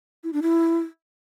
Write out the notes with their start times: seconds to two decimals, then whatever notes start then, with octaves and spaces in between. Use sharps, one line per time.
0.24 E4
0.33 D4
0.42 E4